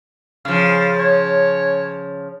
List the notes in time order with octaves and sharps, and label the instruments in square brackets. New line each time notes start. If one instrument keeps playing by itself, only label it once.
[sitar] C#3 F3 [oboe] F5
[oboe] C#5